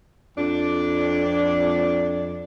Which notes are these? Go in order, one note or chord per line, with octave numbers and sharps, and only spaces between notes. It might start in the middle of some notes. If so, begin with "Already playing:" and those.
F2 D4